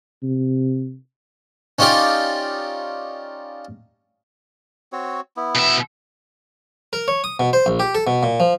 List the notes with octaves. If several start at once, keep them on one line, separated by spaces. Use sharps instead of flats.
C3
C#4 D#4 F4 G4 D5
C4 F#4 C#5
B3 E4
B2 E5
A#4
C#5
D#6
B2
C5
A#1
G4
A4
B2
A#2
F3